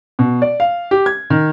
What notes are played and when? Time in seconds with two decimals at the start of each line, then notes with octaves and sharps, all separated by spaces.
0.19 B2
0.42 D5
0.60 F5
0.91 G4
1.06 G#6
1.30 D#3